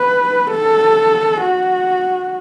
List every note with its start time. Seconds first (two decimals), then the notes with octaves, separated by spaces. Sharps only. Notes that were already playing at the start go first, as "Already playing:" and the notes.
Already playing: B4
0.51 A4
1.42 F#4